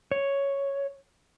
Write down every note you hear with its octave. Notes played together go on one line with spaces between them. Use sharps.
C#5